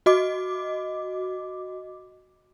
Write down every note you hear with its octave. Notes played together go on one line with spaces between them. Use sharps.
F#4 D#5 D6